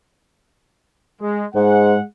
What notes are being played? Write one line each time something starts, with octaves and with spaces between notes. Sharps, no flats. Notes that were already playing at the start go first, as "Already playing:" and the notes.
G#3
G#2 G#3 F#5